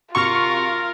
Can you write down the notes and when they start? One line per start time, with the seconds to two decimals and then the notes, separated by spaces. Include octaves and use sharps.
0.15 C3 F4 F#4 A#4 F5 C6 C#6